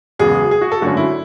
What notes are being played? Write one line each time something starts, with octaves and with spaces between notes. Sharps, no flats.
E1 E2 C#3 F#3 G#4
G#4
F#4
A4
G#1 F#2 D3 A3 C#4 F#4
E4